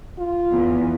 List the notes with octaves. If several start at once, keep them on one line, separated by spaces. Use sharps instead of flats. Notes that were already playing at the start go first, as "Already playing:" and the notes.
F4
E2